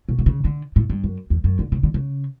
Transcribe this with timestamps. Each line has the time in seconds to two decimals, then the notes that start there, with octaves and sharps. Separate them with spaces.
0.09 B2
0.19 D3
0.26 C#3
0.45 D3
0.76 A2
0.90 G2
1.04 F#2
1.30 E2
1.44 F#2
1.59 D3
1.72 C#3
1.83 D3
1.94 C#3